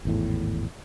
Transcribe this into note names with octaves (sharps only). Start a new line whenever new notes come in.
G#1 E2 A2